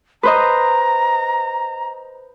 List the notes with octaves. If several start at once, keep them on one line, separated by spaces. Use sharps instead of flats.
B4 C5 D#5 A#5